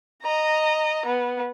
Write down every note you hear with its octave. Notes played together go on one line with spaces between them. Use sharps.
D#5 A#5
B3